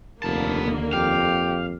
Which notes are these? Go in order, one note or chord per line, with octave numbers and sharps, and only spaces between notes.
F1 D#2 D3 A#3 B3 A5
F2 G4 F5